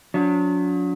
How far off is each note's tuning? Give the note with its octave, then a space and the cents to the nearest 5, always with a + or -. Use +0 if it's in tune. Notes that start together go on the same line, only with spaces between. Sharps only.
F#3 -40 D4 -40